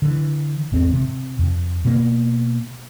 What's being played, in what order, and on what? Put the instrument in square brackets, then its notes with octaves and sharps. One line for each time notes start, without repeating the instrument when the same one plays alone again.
[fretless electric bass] D3 E3
G#1 E2 C4
C3
F2
B2 A#3